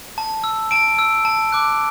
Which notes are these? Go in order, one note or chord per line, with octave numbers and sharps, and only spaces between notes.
A5
E6
A5 D7
E6
A5
D6 F#6